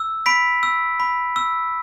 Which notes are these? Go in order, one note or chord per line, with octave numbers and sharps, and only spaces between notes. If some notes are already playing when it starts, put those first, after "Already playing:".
Already playing: E6
B5 B6 D7
E6
B5
E6